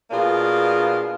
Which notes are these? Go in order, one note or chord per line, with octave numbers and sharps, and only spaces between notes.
B2 A#3 D4 F4 G#4